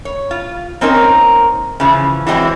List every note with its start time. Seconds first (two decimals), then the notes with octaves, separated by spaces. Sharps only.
0.05 C#5
0.31 F4
0.81 A#3 C4 C#4 D#4 A#4
1.80 C#3 E3 F3
2.27 E3 F#3 G#3 C4 E4